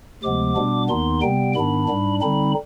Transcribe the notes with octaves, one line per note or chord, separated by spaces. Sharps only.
D2 C3 F3 G#3 B3 D6
B2 G3 B3 D4
D#2 D#3 B3 D#4 C6
C3 G3 B3 G5
G#2 D#3 B3 D4 B5
G#2 G3 D4
D3 G3 C4 D#4 B5